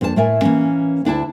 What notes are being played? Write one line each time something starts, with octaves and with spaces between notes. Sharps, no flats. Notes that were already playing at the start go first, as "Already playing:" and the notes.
F2 A#3 D4 B4 A5
A2 A3 A#4 E5 G#5
E3 A#3 C#4
D2 D4 E4 A5